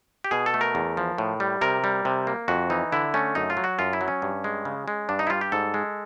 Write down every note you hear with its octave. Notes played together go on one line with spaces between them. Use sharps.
G4
B2 G#4
A4
A3
A#4
E2
F3
A2
G3
C3 A#4
G3
C3
A#3
F2 F#4
E3 D#4
D3 E4
A3 C#4
F#2 D#4
F4
F#3
F#4
F#2 F4
E4
F#3
C#4
G2
G#3
C#3
G#3
G2 D4
D#4
E4
G3 F4
G4
G#2 A4
G#3